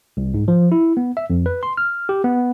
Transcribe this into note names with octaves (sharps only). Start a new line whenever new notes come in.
C2
G#2
F3
E4
B3
E5
F2
B4
C6
F6
G4
B3